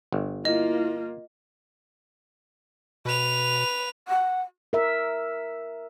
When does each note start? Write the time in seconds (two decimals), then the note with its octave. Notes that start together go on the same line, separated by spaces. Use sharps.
0.12 G1
0.45 A#3 E4 F4 D#5
3.05 B2 B4 F7
4.08 F#5
4.73 A#4 E5